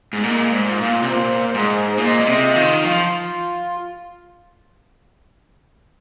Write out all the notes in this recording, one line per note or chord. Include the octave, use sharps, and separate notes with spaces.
G#2
A#2 G#3
G#2
F4
A#2
C3
A#2 C5
G#2 G#3
A#2 D#5
A#2
C3
F4
D#3
F3 F4